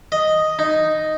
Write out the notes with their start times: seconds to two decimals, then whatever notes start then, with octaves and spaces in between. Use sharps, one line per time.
0.12 D#5
0.59 D#4